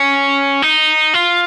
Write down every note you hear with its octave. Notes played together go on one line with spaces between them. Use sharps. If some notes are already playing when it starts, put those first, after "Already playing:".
Already playing: C#4
D#4
F4